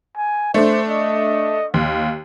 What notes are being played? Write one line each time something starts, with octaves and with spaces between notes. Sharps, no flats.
G#5
A3 D4 C5
D#5
D#2 F5